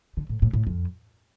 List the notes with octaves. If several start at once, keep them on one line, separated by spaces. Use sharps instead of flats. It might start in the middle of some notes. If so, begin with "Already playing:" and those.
D3
A2
A2
A2
F2